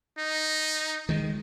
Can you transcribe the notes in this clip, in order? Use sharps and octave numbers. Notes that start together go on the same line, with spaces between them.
D#4
D#3 G#3